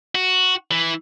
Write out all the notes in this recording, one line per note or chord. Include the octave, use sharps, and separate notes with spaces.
F#4
E3